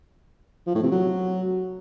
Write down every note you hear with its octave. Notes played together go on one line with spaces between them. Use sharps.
F3
A2
C3
F#3